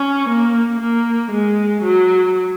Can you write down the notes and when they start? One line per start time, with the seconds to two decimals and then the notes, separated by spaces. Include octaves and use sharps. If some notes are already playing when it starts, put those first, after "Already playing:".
Already playing: C#4
0.29 A#3
0.80 A#3
1.32 G#3
1.83 F#3